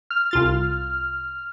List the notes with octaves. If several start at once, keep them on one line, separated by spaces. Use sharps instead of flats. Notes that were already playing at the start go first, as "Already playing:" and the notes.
F6
C2 F4 A6